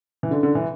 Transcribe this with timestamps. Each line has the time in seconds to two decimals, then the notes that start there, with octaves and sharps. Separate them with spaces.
0.23 E3
0.31 D3
0.43 D3
0.55 E3